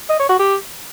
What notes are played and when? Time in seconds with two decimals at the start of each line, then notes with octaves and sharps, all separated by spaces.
0.10 D#5
0.19 C#5
0.29 F#4
0.39 G4